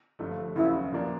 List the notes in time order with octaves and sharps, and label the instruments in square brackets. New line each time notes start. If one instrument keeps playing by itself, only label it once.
[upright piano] G1 G2 D3 F3 A3
[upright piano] F1 D#2 C#3 F#3 B3 [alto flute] E4
[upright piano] A#2 F3 A#3 D4